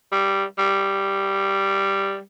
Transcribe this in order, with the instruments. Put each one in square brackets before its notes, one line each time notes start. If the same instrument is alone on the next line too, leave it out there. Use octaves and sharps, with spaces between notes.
[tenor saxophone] G3
G3